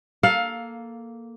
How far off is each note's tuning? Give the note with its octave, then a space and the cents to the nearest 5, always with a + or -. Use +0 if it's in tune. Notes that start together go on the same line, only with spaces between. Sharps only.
A#3 +0 A4 +0 F5 +15